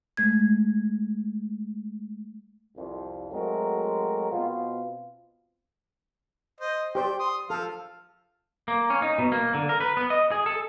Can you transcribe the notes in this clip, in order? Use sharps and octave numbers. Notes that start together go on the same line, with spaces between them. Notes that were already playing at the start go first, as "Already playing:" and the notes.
G#3 A3 G#6
C2 F2
F#3 G#3 A3 C4 F#4 A#4
B2 C4 F4
C5 D#5
G4 C5 D5 G5
C6 D#6
F3 A4 F5
A#3
C#4
D#4
B2
A#3
D3
A#4
B4
B3
D#5
G#4
A4